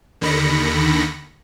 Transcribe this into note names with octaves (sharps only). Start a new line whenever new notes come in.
D#2 D3 D#3 B5 A#6 C#7